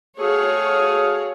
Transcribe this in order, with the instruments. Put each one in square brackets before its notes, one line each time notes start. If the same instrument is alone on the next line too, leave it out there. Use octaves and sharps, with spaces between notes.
[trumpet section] A3 F5 D#6 [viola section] F#4 G#4 C#5